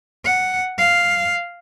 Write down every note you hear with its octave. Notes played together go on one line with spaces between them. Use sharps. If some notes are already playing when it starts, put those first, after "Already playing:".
F#5
F5